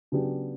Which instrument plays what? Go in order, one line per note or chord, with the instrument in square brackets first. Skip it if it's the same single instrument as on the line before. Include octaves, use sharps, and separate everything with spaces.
[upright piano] C#3 F#3 B3 D4 G4